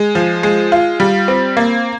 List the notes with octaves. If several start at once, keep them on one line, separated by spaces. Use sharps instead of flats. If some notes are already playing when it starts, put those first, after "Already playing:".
Already playing: G#3
F3
G#3
F4
G3
C4
A#3